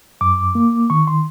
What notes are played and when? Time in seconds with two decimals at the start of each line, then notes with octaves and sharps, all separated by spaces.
0.21 F#2 D6
0.55 A#3
0.90 D#3 C#6
1.07 C6